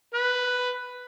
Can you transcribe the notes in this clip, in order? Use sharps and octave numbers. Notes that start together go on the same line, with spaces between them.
B4